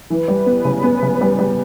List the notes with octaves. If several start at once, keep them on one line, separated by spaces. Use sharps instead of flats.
E3 B4
G3
B3
C#3
B3
C#3
G3
G3